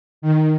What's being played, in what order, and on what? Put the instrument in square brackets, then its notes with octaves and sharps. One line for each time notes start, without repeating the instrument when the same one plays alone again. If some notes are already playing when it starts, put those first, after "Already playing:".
[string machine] D#3